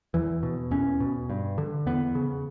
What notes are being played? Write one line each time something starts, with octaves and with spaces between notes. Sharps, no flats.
E2 E3
B2
E2 C#4
B2
G2
D3
E2 B3
C#3